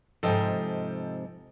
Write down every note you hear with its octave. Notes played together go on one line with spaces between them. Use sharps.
G#2 C3 F3 A4 D#5 G5